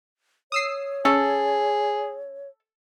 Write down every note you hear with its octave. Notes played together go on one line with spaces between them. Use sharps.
C#5 D#6 E6 C7
C#4 G#4 A4